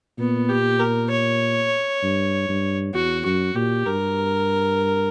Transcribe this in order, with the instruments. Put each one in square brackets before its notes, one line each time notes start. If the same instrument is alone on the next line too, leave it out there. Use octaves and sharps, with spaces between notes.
[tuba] A#2 [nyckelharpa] B3
[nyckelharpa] G4
A#4
C#5
[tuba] G2
G2
[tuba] E2 [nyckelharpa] F#4
[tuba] F#2 [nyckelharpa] F#4
[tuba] A#2 [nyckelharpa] G4
[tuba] G2 [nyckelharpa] A#4